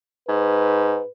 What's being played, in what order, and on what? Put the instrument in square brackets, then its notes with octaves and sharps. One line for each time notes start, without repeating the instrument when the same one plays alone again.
[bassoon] G#2 [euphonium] B4